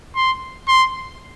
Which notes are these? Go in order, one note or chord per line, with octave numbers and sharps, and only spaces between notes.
C6
C6